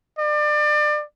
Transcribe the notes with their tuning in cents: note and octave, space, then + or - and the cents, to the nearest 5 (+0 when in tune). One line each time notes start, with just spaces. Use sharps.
D5 +30